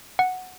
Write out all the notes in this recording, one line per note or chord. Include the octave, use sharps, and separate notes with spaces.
F#5